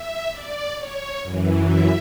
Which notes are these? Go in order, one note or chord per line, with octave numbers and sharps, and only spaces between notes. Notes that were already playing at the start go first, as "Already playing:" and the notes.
Already playing: E5
D5
C#5
F#2 E3
E5